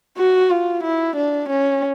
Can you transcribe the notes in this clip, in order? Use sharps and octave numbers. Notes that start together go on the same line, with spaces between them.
F#4
F4
E4
D4
C#4